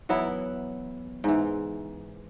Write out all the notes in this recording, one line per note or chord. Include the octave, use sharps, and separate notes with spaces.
E3 F#3 B3 E4
G#2 E3